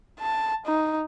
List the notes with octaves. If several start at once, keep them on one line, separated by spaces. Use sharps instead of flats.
A5
D#4